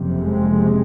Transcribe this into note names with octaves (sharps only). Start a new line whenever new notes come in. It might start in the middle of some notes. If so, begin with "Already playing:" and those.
Already playing: F#1 F2 C3
G#3